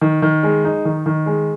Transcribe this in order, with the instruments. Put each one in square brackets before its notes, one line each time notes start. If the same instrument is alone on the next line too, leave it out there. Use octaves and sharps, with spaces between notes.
[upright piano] D#3
D#3
G#3
D#4
D#3
D#3
G#3